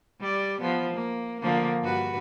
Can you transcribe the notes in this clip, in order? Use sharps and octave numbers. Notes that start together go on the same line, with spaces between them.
G3 D5
F3 B3
A#3
D3 F3 A#3
G2 F#4 B4